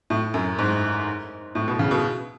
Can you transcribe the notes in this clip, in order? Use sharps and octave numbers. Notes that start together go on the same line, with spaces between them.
A2
F#2
G#2
A2
B2
C#3
B2